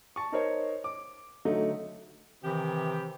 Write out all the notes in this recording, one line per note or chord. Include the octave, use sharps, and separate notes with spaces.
A5 C#6
D#4 A#4 C5 C#5
D6
D3 F#3 A3 D#4
C3 D#3 E3 G4